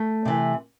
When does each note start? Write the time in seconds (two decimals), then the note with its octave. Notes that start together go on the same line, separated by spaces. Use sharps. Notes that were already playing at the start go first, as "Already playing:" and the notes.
Already playing: A3
0.25 C3 E3